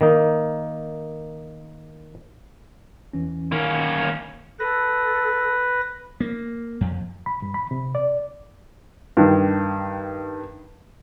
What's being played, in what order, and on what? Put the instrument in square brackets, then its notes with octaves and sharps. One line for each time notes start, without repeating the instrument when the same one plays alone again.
[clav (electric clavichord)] D#3 A#3 D#4
[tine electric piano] E2 E3 C#4
[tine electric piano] D#3 [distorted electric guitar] A#3 C#4
[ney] A4 [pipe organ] B4 A#6
[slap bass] A#3
F2
[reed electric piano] B5
G2
B5
C3
D5
[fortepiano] G2 D#3